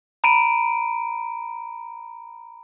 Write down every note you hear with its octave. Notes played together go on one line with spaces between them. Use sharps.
A#5 B5 D7 D#7